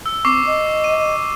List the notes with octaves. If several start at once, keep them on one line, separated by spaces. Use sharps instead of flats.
E6
C4 C#6 D6 C7
D#5
D#7